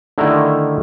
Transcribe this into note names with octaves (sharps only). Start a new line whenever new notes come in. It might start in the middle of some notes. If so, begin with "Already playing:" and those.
D3 D#3 A3 E4 A#4